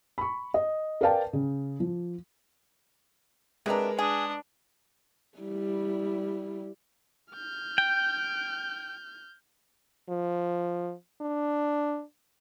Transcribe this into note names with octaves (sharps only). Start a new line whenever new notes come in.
B5 C#6
D#5
A#4 B4 D5 F5 G5 A5
C#3
F3
C3 G#3 D4 A#4 B4 A#5
D4 G#4 D#6
G3 E4
F6 G6
G5
F3
D4